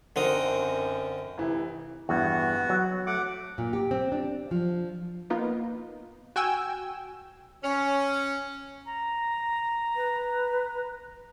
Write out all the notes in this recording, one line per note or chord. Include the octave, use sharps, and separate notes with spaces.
F#2 D3 C4 D#4 F#4 A#4 D#6
F1 E3
E2 G2 B3 F#4
F#3
A3 F#5 D6
A#2
G4
C4
D4
F3
A#3 B3 D#4 F4
F#4 G5 G#5 E6
C#4
A#5
B4